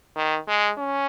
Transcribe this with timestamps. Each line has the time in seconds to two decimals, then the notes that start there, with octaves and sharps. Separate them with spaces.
0.16 D#3
0.48 G#3
0.78 C#4